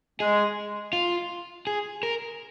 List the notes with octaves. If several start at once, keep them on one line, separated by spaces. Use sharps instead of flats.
G#3 G#4
F4
G#4
A#4